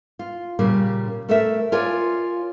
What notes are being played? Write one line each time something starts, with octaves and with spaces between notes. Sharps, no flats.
F4
A#2 C#3 G3 A#3
A3 A4 A#4 E5
F4 A#4 C#5 D5 F5 G#5